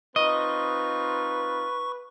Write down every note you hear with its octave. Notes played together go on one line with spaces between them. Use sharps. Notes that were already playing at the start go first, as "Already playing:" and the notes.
C4 D#4 F4 B4 D#5 C#6